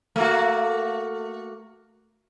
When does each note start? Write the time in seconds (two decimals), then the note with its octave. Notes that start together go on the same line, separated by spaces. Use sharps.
0.16 A3 A#3 F#4